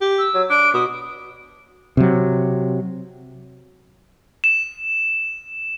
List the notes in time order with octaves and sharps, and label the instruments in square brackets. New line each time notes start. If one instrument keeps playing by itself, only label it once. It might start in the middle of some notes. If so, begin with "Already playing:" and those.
[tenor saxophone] G4
[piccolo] E6
[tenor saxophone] F#3
[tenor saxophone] D4 [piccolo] D7
[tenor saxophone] B2 [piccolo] D#6
[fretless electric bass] C3 F#3
[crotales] E7